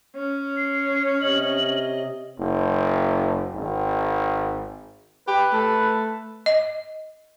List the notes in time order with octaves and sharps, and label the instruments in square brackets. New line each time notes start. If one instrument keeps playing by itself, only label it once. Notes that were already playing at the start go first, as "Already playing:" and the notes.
[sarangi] C#4
[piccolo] C7
[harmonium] C3 D#5 [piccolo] F#7
[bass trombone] F#1
G#1
[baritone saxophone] G4 [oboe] B4
[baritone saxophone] A3
[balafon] D#5